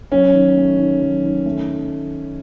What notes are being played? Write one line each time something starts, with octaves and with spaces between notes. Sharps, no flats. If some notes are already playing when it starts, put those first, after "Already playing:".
F#3 C#4
D#3
A3
D#3
F#3
D#3
A3